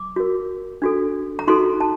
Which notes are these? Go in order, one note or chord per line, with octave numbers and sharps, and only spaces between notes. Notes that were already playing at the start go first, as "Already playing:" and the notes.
Already playing: D6
F#4 A#4
D4 F#4 A4
A#5
D#4 F#4 A4 C6
A5